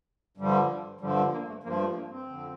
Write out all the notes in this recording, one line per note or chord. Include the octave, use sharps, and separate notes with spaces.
G2 D3 F3 G3
G2 D3 F3 G3
G3
A#3
A3
G2 F3 A#3
A3
A3
A#3
C4
F2 D3 F3